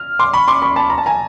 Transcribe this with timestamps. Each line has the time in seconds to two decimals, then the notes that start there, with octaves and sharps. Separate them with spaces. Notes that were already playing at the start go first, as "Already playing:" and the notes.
Already playing: F6
0.19 C6 D6
0.33 B5 C#6
0.48 C6 D6
0.62 B5 C#6
0.76 A5 B5
0.90 A#5
0.98 A5
1.06 G#5 A#5